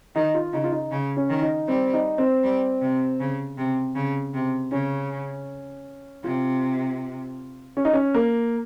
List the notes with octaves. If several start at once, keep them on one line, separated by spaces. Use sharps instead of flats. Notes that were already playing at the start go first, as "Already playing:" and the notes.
D#3 D#4
F4
C#3 D#4
F4
D#4
C#3
C#4
D#3
D#4
G3 C4
D#4
C4
G3
C3
C#3
C3
C#3
C3
C#3 C#4
C3 F4
C#4
D#4
C#4
A#3